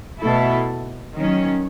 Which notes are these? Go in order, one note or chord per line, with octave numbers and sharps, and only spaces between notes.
B2 A3 E4 A4
D#3 F#3 C#4